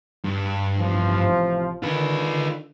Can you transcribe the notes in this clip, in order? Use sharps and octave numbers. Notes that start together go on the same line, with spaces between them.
G2
A1 C3 F3
D3 D#3 F4 B4